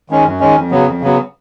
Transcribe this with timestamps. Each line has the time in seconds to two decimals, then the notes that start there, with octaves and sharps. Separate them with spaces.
0.10 D#3 G#3 C#4
0.25 F#2
0.40 D#3 G#3 C#4
0.56 F2
0.71 C#3 F#3 B3
0.87 F2
1.02 C#3 F#3 B3